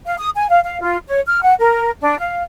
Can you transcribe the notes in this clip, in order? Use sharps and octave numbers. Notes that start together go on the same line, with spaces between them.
F5
D#6
G#5
F5
F5
F4
C#5
F6
F#5
A#4
D4
F5